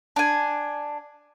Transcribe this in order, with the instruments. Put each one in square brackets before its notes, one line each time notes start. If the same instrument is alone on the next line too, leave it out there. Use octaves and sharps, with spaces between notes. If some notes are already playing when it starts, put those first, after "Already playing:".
[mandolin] D4 G#5